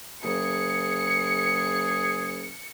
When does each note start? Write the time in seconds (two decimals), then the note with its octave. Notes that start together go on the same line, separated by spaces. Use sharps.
0.23 F#1 G#4 C#7